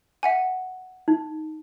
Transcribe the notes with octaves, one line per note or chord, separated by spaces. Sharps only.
E5 F#5 G#5
D#4